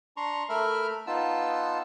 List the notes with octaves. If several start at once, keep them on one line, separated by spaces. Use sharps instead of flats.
D4 A#5 C6 C#6
A3 A#4 E5 B5 F6
B3 D#4 F4 A5 E6